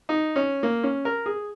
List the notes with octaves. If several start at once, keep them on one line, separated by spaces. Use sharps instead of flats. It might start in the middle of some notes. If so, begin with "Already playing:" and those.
D#4
C#4
A#3
C#4
A#4
G#4